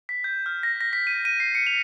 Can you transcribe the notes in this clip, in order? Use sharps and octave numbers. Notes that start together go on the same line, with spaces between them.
B6
G6
F6
A#6
A#6
B6
D#7
D#7
C7
C#7
F7